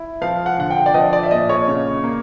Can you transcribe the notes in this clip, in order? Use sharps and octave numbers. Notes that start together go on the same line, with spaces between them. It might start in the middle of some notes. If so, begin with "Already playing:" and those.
Already playing: E4
F3 F5
F#5
D3 F#5
G5
D5
F3 D#5
D5
E5
A#2 D#5
C#5
C#3
A#3